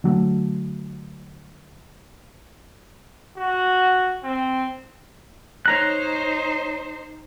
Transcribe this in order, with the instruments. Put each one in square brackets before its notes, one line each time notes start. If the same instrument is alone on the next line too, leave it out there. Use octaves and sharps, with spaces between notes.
[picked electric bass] D3 F#3 G3 A3
[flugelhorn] F#4
C4
[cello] D#4 C5 [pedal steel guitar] C#5 A#5 F#6